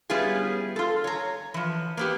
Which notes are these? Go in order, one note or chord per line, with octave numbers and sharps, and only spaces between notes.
G3 B3 C#4 E4 F4 G#4
F4 A4
C#5 A#5
E3 F3
A#3 B3 G4